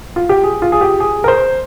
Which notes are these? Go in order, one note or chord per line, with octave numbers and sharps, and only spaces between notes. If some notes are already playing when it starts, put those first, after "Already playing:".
F4
G4
G#4
F4
G#4
G4
G#4
A#4
C5